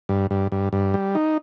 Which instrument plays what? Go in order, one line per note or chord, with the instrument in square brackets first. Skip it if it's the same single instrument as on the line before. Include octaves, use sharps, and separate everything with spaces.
[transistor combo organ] G2
G2
G2
G2
G3
D#4